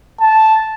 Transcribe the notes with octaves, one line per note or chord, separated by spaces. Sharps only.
A5